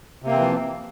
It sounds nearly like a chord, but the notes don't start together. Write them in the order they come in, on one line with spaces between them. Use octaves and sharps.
C3 A#3 C4 E3 F3